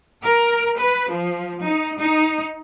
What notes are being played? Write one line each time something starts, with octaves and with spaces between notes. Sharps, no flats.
A#4
B4
F3
D#4
D#4